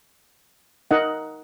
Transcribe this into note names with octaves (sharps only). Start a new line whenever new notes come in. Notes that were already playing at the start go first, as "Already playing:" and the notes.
D#4 A#4 D#5 F#5